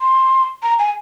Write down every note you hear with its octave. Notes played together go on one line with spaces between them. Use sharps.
C6
A#5
G#5